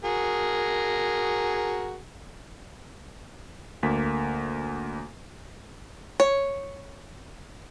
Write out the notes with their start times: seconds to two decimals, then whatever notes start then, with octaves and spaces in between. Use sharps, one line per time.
0.05 F#4 G#4 A#4
3.83 D2 A#3 B6
6.20 C#5